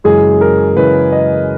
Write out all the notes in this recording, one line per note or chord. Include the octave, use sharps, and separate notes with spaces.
F#2 C#3 E3 G#3 G#4
A#4
F#2 C#3 E3 G#3 B4
D#5